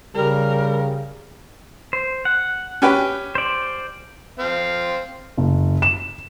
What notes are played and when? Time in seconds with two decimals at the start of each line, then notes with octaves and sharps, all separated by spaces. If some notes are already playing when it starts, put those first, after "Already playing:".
0.15 C#3 G3 A#4
1.93 C5
2.25 F#5
2.82 C#4 G4 B4
3.35 C5 D5
4.39 C4 F5
5.38 F#1
5.82 E7